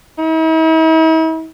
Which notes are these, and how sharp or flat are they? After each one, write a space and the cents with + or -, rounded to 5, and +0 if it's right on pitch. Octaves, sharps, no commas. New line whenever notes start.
E4 -45